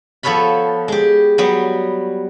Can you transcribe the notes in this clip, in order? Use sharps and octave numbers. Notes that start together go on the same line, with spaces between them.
F3 B3 A4 B4 C#5 B5
G#3 G4
F#3 G3 B3